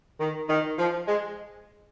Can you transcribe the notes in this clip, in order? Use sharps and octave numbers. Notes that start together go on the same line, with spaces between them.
D#3
D#3
F3
G#3